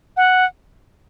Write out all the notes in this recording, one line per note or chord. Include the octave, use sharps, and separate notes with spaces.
F#5